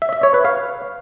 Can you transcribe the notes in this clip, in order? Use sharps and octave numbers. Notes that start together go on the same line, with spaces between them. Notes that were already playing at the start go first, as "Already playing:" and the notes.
E5
E5
C#5
B4
F5